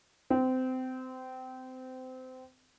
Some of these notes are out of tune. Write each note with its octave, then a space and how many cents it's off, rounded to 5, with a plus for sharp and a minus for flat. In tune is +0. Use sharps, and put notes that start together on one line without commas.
C4 -25